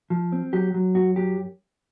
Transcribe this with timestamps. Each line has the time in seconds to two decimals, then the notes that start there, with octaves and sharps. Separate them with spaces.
0.10 F3
0.32 C4
0.53 F#3 G4
0.74 F#3
0.95 F#2 F#4
1.16 F#3 G4